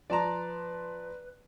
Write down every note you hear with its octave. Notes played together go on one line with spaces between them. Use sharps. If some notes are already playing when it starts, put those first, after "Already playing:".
F3 B4 D5 A5 A#5 C6